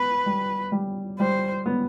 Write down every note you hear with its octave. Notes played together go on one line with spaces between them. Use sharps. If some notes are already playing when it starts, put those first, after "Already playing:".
Already playing: B3 B4
G3
G3
G3 C5
B3